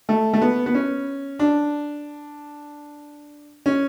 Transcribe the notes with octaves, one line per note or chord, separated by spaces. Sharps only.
A3
A3
B3
B3
C#4
D4
C#4